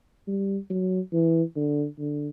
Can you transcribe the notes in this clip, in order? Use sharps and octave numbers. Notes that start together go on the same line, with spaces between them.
G3
F#3
E3
D3
D3